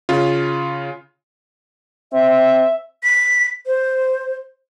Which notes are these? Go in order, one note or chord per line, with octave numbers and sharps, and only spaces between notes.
C#3 F4
C4 E5
B6
C5